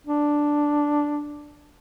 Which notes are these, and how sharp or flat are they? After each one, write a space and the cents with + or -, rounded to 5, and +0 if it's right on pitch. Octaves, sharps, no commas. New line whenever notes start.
D4 +0